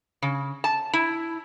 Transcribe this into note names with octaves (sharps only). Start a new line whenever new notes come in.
C#3
A5
E4